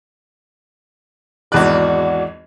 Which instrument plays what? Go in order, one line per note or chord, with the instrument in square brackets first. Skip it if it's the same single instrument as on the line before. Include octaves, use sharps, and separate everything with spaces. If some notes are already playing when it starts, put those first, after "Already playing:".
[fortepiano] G#1 E2 F#6 [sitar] F#4 D5